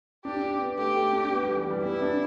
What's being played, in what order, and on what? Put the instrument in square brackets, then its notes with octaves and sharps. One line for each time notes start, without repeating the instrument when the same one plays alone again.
[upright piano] D4 [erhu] G4
[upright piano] D4
B3
[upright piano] A3 [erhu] G4
[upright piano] A3
D4
B3
G3
E3
G3
[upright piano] B3 [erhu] E4
[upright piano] D4